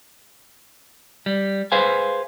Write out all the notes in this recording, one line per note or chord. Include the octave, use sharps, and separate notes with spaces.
G3
G#4 B4 C5 F5 G#5